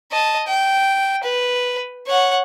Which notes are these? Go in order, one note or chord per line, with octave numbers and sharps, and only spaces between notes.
D#5 A5
G5
B4
C#5 F#5